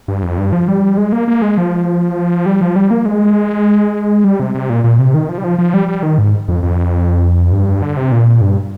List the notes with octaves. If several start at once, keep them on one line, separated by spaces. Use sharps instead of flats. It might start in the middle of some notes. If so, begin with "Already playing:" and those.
G2
F2
G2
F3
G3
G#3
A#3
A#3
G#3
F3
G3
F3
G3
A#3
G#3
G3
C3
C3
A#2
A#2
C3
D#3
F3
G3
F3
F3
G3
G3
D#3
G#2
F2
F2
G2
D3
C3
A#2
G2